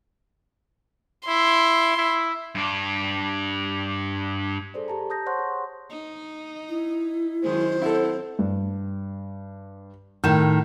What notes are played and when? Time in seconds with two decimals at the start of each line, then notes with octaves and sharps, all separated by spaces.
1.28 E4 C6
1.97 E4
2.55 G2 D4
4.74 G#4 A4 C5 D5
4.88 G4 A5 A#5
5.10 A5 D#6 G6 A#6
5.26 C5 C#5 F#5 C6 C#6 F#6
5.39 G#4
5.90 D#4
6.69 E4
7.43 F#2 D#3 G#3 C5
7.82 C4 E4 A4 F#5
8.39 G2
10.24 A2 D#3 G6 E7